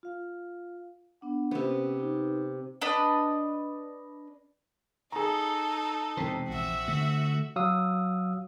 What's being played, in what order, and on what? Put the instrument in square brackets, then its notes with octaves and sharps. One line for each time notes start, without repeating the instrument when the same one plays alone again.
[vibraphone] F4 F5
B3 D4 F#5
[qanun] C3 B3 [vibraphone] C#4 C5
[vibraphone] D#4 B4
[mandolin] D4 B4 D#5
[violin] D#4 A4 [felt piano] G#4 A#5
[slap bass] E1 C3 [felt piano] C4
[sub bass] A#1 [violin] F#4 E5
[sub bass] D3 [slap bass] A3
[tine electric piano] F#3 F#4 F5 D#6 E6